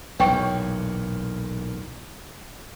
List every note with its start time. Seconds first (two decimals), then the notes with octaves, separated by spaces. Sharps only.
0.20 B1 E2 A#2 C#5 G5 C#6